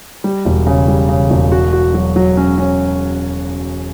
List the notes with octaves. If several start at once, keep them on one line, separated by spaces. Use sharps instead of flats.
G3
E1
C#3
G3
C#3
E1
F#4
F#4
F#3
F#3
C#4
C#4